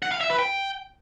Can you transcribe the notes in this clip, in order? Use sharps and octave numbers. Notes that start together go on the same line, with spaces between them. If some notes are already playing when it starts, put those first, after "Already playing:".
F#5
F5
E5
B4
G5